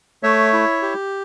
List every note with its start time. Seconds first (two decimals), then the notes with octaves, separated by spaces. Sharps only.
0.23 A3 C#5 E5
0.53 E4
0.82 G4